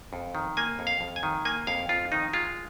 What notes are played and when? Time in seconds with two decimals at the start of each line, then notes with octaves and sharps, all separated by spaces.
0.13 F2
0.35 D#3
0.57 A#3 G#5
0.79 F2
0.87 F5
1.01 F2
1.16 G#5
1.23 D#3
1.45 A#3 G#5
1.67 F2 F5
1.89 F2 F4
2.12 D#3 D#4
2.34 G#3 F4